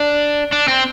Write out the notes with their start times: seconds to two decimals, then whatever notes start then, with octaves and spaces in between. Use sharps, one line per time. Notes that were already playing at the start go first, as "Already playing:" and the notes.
Already playing: D4
0.52 D4
0.68 C4